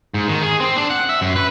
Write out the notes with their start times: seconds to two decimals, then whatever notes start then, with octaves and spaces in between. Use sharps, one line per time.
0.14 G#2
0.28 D#3
0.42 G#4
0.60 C4
0.77 D4
0.90 F#5
1.09 E5
1.22 F#2
1.36 B4